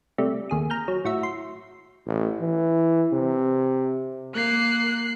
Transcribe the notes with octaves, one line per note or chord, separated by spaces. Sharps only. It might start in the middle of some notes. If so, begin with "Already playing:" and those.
C3 G3 A3
D#2 G#4 D#6
A#5 F6 G6
F#3
A2 F#4 E5
C6
A1
E3
C3
A#3 F#6 C7